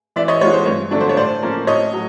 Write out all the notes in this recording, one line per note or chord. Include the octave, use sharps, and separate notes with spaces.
E3 D5 E5
C#5 D#5
G#3 B3 D4 F4 C#5
C5
G2 C#5
D3 F#3 A3 D4
C5
C#5
A2 C5 D5
F3 A#3 C#4
A2 C#5 D#5
F#3